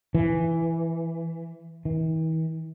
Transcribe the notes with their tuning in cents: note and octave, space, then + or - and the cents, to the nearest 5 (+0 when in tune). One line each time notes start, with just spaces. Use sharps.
E3 +5
E3 -45